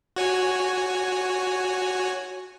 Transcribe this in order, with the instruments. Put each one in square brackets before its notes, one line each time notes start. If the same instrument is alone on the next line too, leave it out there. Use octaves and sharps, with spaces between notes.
[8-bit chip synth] F#4 C#5 G#5